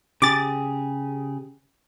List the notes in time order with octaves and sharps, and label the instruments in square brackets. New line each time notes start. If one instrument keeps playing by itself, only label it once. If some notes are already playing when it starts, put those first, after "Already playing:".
[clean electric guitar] C#3 G4 G#4 [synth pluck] D6 A6